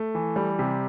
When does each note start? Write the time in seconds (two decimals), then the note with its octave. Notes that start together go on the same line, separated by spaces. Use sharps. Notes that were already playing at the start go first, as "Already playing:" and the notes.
Already playing: A3
0.15 E3
0.36 G3
0.59 C3